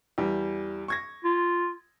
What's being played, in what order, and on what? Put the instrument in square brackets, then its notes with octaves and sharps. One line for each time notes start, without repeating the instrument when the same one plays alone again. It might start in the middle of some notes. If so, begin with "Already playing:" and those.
[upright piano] E2 G3
C#6 G#6 A#6
[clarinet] F4